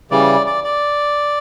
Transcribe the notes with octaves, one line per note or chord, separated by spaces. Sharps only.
C#3 E3 G3 D5
D5
D5